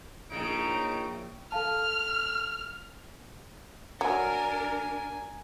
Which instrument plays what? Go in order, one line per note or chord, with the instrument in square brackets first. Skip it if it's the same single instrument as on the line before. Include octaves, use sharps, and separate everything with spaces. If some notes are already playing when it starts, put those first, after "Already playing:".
[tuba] A#1 [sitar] A2 C#3 [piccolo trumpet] D#4 [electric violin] D7
[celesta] A4 F5 A5 [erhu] F6
[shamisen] F#3 [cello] D4 A#4 [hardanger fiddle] G#5